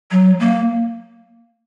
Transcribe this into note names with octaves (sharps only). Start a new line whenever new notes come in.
F#3
A#3